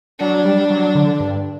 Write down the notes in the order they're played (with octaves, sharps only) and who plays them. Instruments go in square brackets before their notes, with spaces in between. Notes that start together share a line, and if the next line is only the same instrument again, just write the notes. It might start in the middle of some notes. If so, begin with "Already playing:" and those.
[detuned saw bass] F#3 [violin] D4
[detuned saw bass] G3
F#3
D3
G2